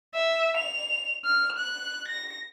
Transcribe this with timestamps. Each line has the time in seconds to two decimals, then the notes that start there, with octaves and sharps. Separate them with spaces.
0.15 E5
0.57 F7
1.25 F6
1.58 F#6
2.08 A#6